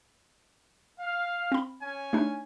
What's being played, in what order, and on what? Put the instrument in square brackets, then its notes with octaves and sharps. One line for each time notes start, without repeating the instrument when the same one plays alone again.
[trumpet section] F5
[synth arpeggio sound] C4 B5
[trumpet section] C#4 G#5
[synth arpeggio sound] A3 D4 D#4